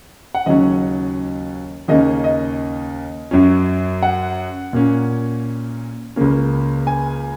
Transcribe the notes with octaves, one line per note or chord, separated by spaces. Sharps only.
F#5
D#2 C#3 F#3 C#4 D#5
D#2 C#3 A#3 C#4 D#5
D#5
F#2 F#3 C#4
F#5
A#2 A#3 C#4
C#2 C#3 A#3 C#4
G#5